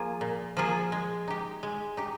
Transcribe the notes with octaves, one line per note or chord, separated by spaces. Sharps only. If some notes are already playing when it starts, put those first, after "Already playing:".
Already playing: F3 A#3 F4 G#4
A#2
F3 A#3 F4 G#4
G#3
D#4 G4
G#3
D#4 G4